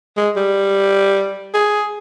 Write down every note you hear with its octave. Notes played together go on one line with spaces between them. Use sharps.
G#3
G3
G#4